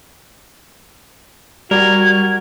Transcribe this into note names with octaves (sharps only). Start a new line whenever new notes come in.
G3 F#4 A#4 G#6